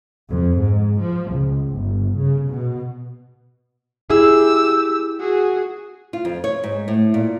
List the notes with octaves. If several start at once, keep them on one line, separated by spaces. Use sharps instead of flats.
F2
G#2
F3
C#2
G1
C#3
B2
E4 G4 G#4 E6
F#4 G#4
F4
F2
C#5
G#2
A2
A#2